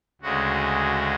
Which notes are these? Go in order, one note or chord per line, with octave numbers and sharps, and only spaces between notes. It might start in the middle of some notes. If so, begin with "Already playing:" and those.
D2 C#3 G#3 F#4